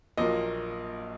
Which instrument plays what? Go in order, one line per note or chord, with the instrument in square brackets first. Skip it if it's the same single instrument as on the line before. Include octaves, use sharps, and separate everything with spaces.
[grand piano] A#1 A#2 F#3 A#3 D#5